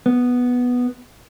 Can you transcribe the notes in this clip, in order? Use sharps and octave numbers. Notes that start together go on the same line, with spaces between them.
B3